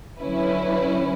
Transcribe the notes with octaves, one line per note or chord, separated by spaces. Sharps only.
D3 F#3 C#4 E4 B4